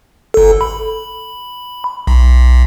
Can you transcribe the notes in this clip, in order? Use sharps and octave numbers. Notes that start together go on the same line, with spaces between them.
G1 A4
B5
B1